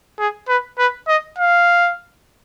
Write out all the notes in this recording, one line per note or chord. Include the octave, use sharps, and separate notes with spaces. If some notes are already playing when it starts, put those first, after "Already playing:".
G#4
B4
B4
D#5
F5